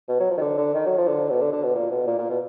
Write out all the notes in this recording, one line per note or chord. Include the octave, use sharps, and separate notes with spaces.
B2
F#3
F3
D#3
D3
D3
D#3
F#3
F3
D3
B2
D3
D3
B2
A#2
B2
A#2
A#2
B2